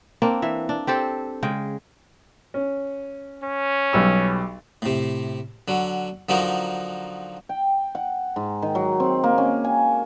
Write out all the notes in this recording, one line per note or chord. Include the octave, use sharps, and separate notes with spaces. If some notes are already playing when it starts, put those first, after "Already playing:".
A#3 C4 D4
E3 E5
D4
C4 G4 A4 C5
C#3 G#3 G5
C#4
C#4
B1 G3 E6
A2 C3
D3 F#3
D3 F3 F#3 D#4 A#4
G5
F#5
G#2
D#3
F#3
C4
A#3
C#4
G#5